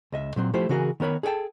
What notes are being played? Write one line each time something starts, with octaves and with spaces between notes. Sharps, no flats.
C#2 D#5 E5
A#2 F#3 C4
F3 A3 E4 G4 C5
C#3 E3 F#4 G#4 A#4
D#3 B3 A#4 C#5 B5
G#4 A4 D5 G5 A5